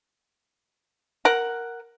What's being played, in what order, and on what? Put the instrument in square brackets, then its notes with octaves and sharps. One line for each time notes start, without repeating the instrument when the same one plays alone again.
[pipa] A#4 F#5